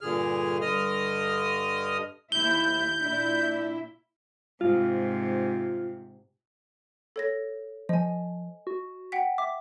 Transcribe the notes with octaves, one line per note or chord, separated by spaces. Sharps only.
G2 A#2 D3 G#4 F6
G2 D3 D#5 D#6 F6
D#2 E4 E5 G6 G7
A#2 D4 E4 E5
G#2 C3 F4
A4 C#5 A#6
F3 D#5 G#5
F#4
F#5 G5 B6
E5 D6